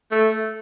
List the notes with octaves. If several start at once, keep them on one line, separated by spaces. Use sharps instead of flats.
A3